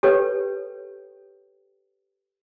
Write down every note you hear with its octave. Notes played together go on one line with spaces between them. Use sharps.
G4 A4 B4 C#5 G5